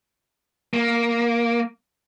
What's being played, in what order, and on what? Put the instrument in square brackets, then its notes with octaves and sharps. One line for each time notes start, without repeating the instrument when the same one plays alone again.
[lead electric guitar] A#3